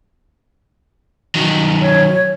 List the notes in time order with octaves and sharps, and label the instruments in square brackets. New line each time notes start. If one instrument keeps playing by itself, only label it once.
[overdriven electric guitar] D#3 F#3
[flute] C#5